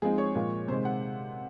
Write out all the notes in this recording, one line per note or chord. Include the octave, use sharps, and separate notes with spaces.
F3 G#3 C4 D#4 G#4
C#5
A#2 F3 G#3
C3 D#3 G#3 C5
F#5